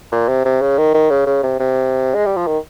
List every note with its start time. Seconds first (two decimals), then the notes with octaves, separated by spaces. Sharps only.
0.12 A#2
0.29 C3
0.45 C3
0.62 C#3
0.78 D#3
0.94 D#3
1.11 C#3
1.27 C#3
1.43 C3
1.60 C3
2.15 G#3
2.26 G3
2.37 F3
2.47 D#3